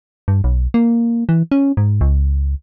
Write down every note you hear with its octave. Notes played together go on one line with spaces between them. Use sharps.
G2
B1
A#3
E3
C#4
G#2
C#2